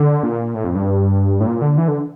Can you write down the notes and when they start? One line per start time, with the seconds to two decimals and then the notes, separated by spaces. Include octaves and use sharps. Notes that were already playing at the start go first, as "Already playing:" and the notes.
Already playing: D3
0.23 A#2
0.54 A2
0.64 F2
0.75 G2
1.40 A2
1.47 A#2
1.62 D3
1.78 E3
1.88 D3